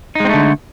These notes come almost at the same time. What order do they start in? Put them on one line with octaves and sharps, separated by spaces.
D#4 G#3 C4 A3 D3